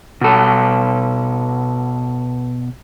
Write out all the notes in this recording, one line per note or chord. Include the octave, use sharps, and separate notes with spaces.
B2 A4